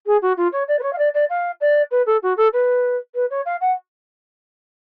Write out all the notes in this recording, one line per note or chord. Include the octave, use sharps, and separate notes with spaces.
G#4
F#4
F4
C#5
D5
B4
C#5
F5
D5
D5
F5
D5
B4
A4
F#4
A4
B4
B4
C#5
F5
F#5